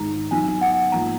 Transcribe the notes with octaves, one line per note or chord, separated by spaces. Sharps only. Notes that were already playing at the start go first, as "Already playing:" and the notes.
Already playing: G#2 D#3 G#3 A#5
F#3 B3 D#4 G#5
F#5
G#2 F3 A#3 A#5